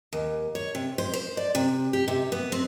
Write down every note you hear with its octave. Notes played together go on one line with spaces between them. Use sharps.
D#2
C#5
C3
C5
C5
D5
C3
G4
C3
B3
C4